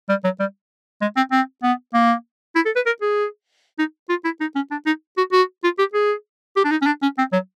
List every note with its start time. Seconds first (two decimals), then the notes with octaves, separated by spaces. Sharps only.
0.09 G3
0.24 F#3
0.40 G3
1.02 G#3
1.17 C4
1.32 C4
1.63 B3
1.94 A#3
2.56 E4
2.66 A4
2.76 B4
2.86 A#4
3.02 G#4
3.79 D#4
4.09 F4
4.25 E4
4.40 D#4
4.55 C#4
4.71 D4
4.86 D#4
5.17 F#4
5.33 F#4
5.64 F4
5.79 G4
5.94 G#4
6.56 G4
6.64 D4
6.71 D#4
6.82 C#4
6.86 D4
7.02 C#4
7.18 C4
7.33 F#3